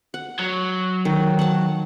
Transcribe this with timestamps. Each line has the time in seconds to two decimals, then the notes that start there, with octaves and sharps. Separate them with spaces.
0.14 F#5
0.39 F#3
1.05 D#3
1.39 F#5 A5